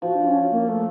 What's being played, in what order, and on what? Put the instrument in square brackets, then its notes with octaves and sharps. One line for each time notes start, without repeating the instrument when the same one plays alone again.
[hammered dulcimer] F3 [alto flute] F#4
[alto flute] D4
C#4
A#3
A3